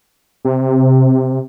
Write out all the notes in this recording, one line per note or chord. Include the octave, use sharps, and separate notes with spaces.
C3